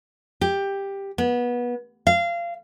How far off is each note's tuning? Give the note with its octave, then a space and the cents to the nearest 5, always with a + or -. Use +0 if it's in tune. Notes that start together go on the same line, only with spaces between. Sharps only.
G4 +10
B3 -25
F5 -25